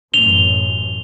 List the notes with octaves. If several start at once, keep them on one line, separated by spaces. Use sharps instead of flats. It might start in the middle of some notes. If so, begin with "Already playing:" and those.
A1 F#2 F7 G7